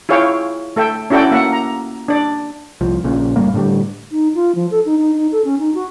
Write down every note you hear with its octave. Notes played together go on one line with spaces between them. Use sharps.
E4 F4 G#4 C#5 F5 G5
A3 A4 E5 G5
C#4 E4 F#4 A4 D5 G5
A#3 E5 F#5
A#5
D4 D5
C2 F3
A#1 A#2 C#3
F#1 A2 G3 A#3
A2 D3 D#3 G3
D#4
F4
F3
A4
D#4
D#4
D#4
A4
C#4
D#4
F#4